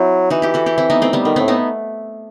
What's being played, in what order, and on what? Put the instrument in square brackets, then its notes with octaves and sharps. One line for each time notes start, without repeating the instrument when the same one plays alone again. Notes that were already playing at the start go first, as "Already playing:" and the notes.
Already playing: [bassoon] F#3 [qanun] C4 E4
[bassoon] E3 [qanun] D#4 F#4
[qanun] E4 G4
F#4 A4
E4 G4
C4 E4
B3 D#4
A3 C4
G3 B3
[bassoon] D#3 [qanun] A3
[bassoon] A2 [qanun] A3 C4
[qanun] B3 D#4